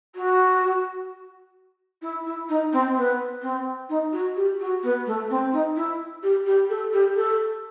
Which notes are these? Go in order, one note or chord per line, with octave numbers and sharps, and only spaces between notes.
F#4
E4
E4
D#4
C4
B3
C4
D#4
F#4
G4
F#4
B3
A3
C4
D#4
E4
G4
G4
A4
G4
A4